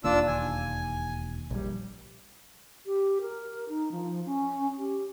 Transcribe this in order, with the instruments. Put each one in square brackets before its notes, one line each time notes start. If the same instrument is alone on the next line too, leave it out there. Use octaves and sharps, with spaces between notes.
[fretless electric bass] E1 D#2 A#3 [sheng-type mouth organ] D4 F4 E6
[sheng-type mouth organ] G#5
[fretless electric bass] A#1 G3
[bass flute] G4
A#4
D#4
F3
C#4
G4